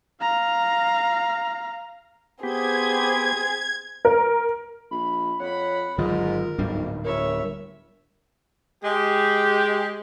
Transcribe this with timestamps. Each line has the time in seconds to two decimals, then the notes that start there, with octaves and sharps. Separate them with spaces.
0.21 F5 A#5
2.43 B3 C4 G4 G#4 G#6
4.05 A#4
4.91 A#1 B5
5.40 F2 C#5 F#5 B5
5.98 G1 G#2 D#3 F#3 F4 A#4
6.58 D1 B1 G#2 G3 D4
7.04 G1 A#4 C#5 E5
8.83 G#3 G4